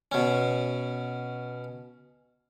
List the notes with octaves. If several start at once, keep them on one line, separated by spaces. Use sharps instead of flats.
B2 C#4